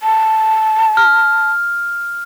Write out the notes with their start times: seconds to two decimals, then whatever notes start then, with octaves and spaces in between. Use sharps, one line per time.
0.03 A5
0.97 F6